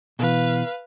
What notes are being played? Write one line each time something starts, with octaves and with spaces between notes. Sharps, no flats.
B2 E3 B4 F5